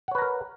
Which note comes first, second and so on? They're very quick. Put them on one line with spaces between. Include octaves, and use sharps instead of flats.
F#5 C#5 B4 A#5 A#4